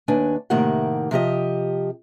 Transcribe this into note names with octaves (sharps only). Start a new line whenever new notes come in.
D#2 D4 B4 G#5
A2 C3 D#3 A#3 G4 F#5
C3 F3 G4 D#5